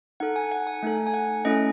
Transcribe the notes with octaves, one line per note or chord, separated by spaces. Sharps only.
D#4 A4 F#5
G#5
F#5
G#5
A3 D#4 A4
G#5
F#5
A3 C#4 E4 A4 D#5